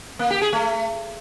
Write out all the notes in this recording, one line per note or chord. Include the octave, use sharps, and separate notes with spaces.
A#3
G4
G#4
A3